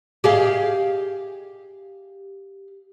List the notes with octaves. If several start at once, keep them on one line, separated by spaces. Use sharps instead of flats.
G4 G#4 F5